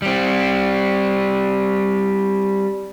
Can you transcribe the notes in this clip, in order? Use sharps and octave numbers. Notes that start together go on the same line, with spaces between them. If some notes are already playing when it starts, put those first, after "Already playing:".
G3 C4